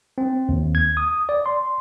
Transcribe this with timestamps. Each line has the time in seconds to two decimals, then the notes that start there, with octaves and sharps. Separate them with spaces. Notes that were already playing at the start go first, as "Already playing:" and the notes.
0.18 C4
0.49 D#2
0.75 G#6
0.97 D#6
1.29 D5
1.46 C6